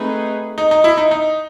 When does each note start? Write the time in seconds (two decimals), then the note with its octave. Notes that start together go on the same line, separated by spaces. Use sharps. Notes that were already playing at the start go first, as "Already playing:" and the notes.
Already playing: A3 C4 D#4 G#4 B4
0.58 D#4
0.71 D#4
0.84 E4
0.97 D#4
1.11 D#4